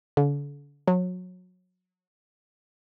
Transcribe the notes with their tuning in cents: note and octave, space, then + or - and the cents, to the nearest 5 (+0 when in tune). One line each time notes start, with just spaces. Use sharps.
D3 -40
F#3 -25